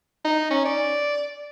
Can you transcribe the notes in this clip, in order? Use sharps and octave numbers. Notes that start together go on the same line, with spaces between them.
D#4
C#4
D5